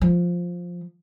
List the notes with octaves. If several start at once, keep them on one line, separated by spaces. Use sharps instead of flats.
F3